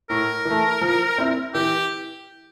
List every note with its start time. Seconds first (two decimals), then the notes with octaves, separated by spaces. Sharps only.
0.10 A2 A#4
0.45 E3 A3
0.81 F3
1.18 C4 E4
1.54 E3 G4